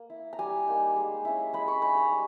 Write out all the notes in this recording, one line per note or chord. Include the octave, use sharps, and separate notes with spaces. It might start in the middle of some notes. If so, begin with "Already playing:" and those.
Already playing: A#3
E4
A#5
G3 G#5
A#3 D#4
G#3
C#4 E4
G#3 B5
C#6
D#4 B5
A#5
G3